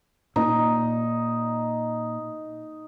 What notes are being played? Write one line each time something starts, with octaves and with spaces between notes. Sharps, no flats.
A#2 D#4